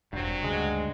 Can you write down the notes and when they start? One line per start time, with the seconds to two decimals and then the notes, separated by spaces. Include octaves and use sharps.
0.13 E1 G2 F#3 C4
0.43 D2 C#3 G#3